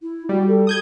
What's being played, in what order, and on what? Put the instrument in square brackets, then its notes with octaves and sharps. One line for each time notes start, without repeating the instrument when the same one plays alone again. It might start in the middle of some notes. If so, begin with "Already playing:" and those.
[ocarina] E4
[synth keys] G3 [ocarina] F#4
[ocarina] A4
[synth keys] D#6 G6 G#6